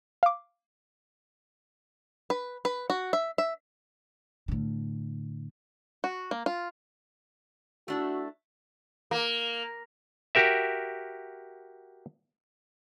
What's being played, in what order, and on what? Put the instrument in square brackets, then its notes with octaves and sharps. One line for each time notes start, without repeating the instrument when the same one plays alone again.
[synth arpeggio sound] F5 D6
[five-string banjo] B4
B4
F#4
E5
E5
[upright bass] A2 D3
[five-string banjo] F#4
A#3
F4
[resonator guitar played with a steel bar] A3 D4 E4 [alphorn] F#4
[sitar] A#3
[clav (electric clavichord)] F#4 G4 A#4 E5